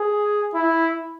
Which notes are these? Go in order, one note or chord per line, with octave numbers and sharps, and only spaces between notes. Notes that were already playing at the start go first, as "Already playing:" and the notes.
Already playing: G#4
E4